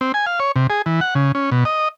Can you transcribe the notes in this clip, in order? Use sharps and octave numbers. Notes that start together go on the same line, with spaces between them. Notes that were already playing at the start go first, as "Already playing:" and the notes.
C4
G#5
F5
C#5
C3
G#4
E3
F#5
C#3
C#4
B2
D#5